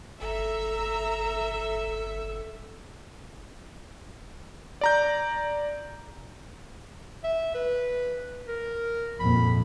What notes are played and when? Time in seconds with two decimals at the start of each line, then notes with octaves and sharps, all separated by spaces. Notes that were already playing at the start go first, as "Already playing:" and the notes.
0.21 G1 A4 E5 A#5 E6
4.81 D5 A#5 G6
7.24 E5
7.55 B4
8.48 A#4
9.20 G#1 F2 A#2 B5